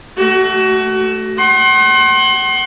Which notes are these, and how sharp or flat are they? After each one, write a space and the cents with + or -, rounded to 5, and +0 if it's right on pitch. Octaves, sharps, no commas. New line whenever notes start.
A3 -5 F#4 +25
F#5 +35 C6 +35